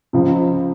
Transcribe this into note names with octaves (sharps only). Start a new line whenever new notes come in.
C#2 C#3 F3